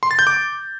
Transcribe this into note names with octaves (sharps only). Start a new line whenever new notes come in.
C6
A6
G6
D6